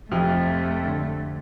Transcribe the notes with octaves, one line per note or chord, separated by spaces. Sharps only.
F1 F2 C3 F3 A3 C4
D3